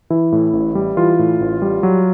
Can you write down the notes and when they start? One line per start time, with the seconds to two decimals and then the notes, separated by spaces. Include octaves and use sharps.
0.10 E3 E4
0.32 A2
0.53 A1
0.75 G3
0.97 E3 F4
1.19 A2
1.40 A1
1.62 G3
1.83 F#3